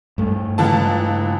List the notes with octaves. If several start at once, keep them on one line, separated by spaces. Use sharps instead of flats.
G2 A3
C#2 E3 A5